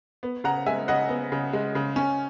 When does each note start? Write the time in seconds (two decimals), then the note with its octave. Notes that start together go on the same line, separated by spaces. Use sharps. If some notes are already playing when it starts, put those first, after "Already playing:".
0.23 B3
0.44 C#3 F#5 A#5
0.66 G#3 E5 G#5
0.88 C#3 D#5 F#5
1.09 B3
1.32 C#3
1.53 G#3
1.75 C#3
1.96 C#4